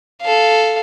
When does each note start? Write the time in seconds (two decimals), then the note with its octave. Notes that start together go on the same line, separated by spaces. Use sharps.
0.21 A4 F5